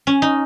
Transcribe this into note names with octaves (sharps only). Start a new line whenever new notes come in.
C#4
D#4